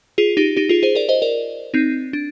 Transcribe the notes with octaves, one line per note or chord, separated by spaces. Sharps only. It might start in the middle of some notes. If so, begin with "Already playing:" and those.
F4 G#4
D#4 G4
D#4 G4
F4 G#4
G#4 C5
A#4 D5
C5 D#5
A#4 D5
C4 D#4
D4